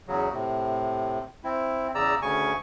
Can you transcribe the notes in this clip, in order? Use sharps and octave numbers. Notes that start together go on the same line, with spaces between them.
E2 C#3 F#3
A2 C3
C4 E4
E2 C#3 D5 A#5 E6
D2 C#3 G#5 C#6